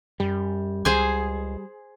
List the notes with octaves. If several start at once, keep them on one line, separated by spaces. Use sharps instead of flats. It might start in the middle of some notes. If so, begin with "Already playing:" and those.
F#2 G3
C#2 G#4 C5 G#5